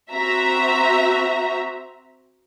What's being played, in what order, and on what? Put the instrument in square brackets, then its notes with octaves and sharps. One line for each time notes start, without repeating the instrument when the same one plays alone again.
[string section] C4 F#4 E5 A#5